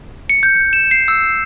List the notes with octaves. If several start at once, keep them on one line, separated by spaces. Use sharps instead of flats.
C#7
G6
E7
C7
E6